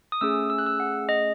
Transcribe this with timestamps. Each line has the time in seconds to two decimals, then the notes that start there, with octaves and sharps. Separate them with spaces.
0.12 D#6
0.21 A3 C#4 G#4 E6
0.50 E6
0.58 F#6
0.66 E6
0.80 F#5
1.09 D#5